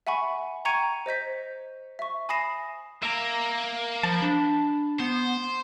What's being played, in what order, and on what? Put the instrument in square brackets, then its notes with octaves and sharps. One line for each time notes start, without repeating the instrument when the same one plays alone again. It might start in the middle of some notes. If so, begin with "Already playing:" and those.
[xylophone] E5 F#5 G#5 B5 C#6
G5 A#5 C#6 G#6 C#7 D#7
C5 D#5 G6 B6
E5 C#6
G#5 B5 D#6 A#6 C7 E7
[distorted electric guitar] A#3 [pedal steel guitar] E5 A#5
[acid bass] F3 [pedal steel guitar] A5 B5
[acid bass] D4
[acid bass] B3 [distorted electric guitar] C5